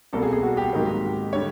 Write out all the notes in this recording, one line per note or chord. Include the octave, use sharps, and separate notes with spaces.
C2 B2 G3 A#3 A4
G#4
G#4
F#4
G4
G#2 D#3 F#3 A#3
D3 G3 C#5